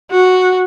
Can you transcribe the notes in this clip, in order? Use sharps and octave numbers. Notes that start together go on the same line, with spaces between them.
F#4